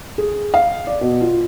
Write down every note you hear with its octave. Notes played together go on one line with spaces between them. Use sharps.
G#4
F5
D5
B2
F4